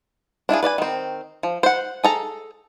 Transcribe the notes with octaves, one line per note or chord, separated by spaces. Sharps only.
D4 E4 F4 G#4
B4 D5 D#5 G#5
D#3 C4
F3
C5 F#5
G#4 A4 A#5